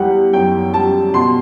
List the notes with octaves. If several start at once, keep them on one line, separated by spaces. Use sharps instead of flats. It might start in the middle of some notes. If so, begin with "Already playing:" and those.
Already playing: E2 G3 F#5
F#2 G5
G3 A5
B2 C6